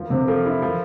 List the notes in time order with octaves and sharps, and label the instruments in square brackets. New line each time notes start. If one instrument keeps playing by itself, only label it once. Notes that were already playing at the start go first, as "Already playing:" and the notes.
Already playing: [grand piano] F3 [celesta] A#4
[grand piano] C3 [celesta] C5
[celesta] A#4
[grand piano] F3 [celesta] A4
[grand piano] E4
[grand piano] F3 [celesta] A#4